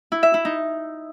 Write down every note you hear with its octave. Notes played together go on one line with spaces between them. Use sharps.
E4
E5
E4
D#4